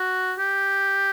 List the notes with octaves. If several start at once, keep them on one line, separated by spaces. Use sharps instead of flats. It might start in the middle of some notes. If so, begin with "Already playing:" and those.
Already playing: F#4
G4